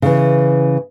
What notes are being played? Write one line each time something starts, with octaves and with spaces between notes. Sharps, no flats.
C#3 E3